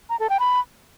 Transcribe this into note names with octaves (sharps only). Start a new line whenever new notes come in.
A#5
A4
G5
B5